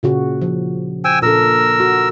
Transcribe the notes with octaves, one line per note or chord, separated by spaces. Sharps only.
A#2 C#3 F#4
F3
C5 G5 G#5 E6
A#2 D4 A4 A#4 E6
F#4